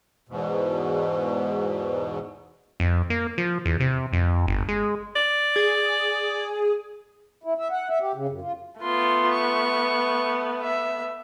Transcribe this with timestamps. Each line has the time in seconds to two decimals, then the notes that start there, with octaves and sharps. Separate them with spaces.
0.29 E2 G#2 B2
2.80 F2
3.10 A#3
3.38 F3
3.66 E2
3.80 C3
4.13 F2
4.47 G1
4.69 G#3
5.16 D5
5.56 G#4
7.44 E4
7.58 E5
7.71 F#5
7.89 E5
8.01 G4
8.15 C#3
8.29 F#2
8.41 F4
8.81 A3 B3 F4 C6
9.33 C#6
10.62 E5